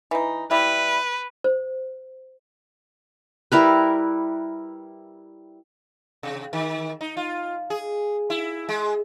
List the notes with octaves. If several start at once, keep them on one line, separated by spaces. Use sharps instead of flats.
E3 D#4
G3 E4 B4
C5
G3 E4 A#4 B4
C3
D#3
D#4
F4
G#4
E4
G#3